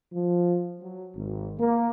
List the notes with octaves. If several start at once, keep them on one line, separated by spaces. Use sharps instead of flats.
F3
F#3
G#1
A#3